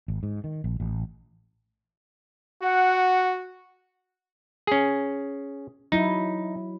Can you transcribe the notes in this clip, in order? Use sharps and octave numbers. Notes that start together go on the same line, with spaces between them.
G#1
G#2
D#3
A#1
A1
F#4 F#5
C#4 G#4
F#3 D#4 E4